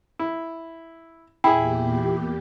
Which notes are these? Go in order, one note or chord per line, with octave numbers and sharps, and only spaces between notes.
E4
E2 A#2 E4 G4 G#4 G5 B5